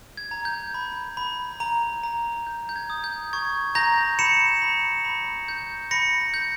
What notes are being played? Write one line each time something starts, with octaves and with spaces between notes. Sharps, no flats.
G#6
A#5
G6
B5
B5
A#5
A#5
G6
G6
G#6
D#6
G6
C#6 G#6
A#5 G6 A#6
B5 C#7 E7
B5
B5
G6
B5 A#6 C#7
G6